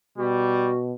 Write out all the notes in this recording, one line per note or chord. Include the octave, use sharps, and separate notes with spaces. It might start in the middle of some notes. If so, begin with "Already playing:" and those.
B2 G3 F#4